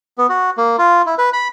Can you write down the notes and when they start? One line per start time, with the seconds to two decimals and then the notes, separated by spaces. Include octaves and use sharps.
0.18 B3
0.29 F#4
0.58 A#3
0.78 F4
1.06 E4
1.18 B4
1.33 B5